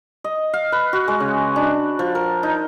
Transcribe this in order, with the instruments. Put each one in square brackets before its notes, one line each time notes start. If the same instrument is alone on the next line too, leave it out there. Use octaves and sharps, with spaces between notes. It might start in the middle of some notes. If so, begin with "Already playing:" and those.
[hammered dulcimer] D#5
F5
B4
F#4
G#3
C#3
D4
F3
A#4
D#4